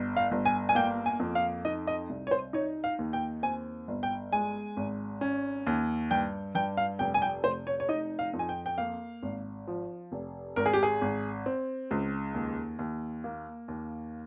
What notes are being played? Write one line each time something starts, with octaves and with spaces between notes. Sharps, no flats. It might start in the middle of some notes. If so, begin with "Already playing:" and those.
Already playing: G1
F5
G1
G#5
G#5
A#3 G5
G#5
F2
F5
D#4 D#5
D#5
C2
C#5
C5
D#4 C#5
F5
D#2
G5
C4 G#5
G1
G5
G#3 G#5
G#1
C#4
D#2
G2 G5
G2 G5
F5
F1 G5
G#5
G5
F1 C5
C#5
C#5
D#4 D#5
F5
F2
G#5
G5
G5
A#3 F5
G#1
F3
F1
G#1 A#4
G#4
G4
G#4
G#1
C4
C#2
D#2
D#2
A#3
D#2